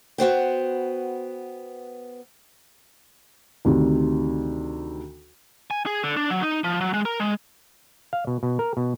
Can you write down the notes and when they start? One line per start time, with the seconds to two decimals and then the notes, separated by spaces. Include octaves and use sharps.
0.18 B3 F#4 C5 G5
3.65 D2 C3 D#3
5.71 G#5
5.86 G#4
6.03 D3
6.17 D4
6.30 F#3
6.42 D#4
6.64 F3
6.81 F#3
6.94 G#3
7.05 A#4
7.20 G#3
8.13 F5
8.27 B2
8.43 B2
8.59 A#4
8.77 B2